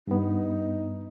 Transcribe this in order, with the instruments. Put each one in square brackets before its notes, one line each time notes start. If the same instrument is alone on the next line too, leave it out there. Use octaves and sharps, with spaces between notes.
[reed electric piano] G2 B3 [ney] D#4